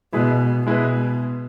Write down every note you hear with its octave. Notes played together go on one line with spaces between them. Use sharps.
B2 G#3 E4 G#4 B4
B2 G#3 E4 G#4 B4